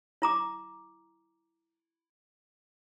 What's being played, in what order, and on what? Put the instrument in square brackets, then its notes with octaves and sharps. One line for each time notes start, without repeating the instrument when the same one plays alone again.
[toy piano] E4 A#5 D6